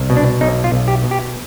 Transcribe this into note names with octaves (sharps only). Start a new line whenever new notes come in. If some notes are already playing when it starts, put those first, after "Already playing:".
Already playing: C2
B2
D4
B1 D#4
F4
B1
G4
B2
G4